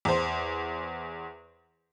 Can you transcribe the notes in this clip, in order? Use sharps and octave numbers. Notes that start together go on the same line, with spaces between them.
E2 C5